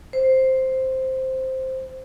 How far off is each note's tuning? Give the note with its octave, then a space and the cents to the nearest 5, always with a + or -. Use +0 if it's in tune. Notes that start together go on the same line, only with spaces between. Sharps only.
C5 +0